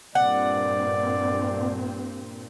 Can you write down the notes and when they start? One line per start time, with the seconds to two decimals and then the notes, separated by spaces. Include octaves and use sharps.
0.15 G2 A#2 C4 D5 F#5